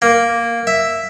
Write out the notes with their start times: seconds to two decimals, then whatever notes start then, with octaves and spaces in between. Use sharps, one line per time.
0.02 A#3
0.67 E5